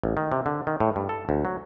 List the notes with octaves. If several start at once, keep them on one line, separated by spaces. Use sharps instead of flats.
A1
D#3
C3
D3
D#3
A2
G2
A4
D2
F#3